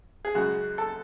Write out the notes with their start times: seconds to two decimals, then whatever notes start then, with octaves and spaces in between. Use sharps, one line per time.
0.25 G#4
0.35 F#2 C#3 G#3 F#4
0.78 A4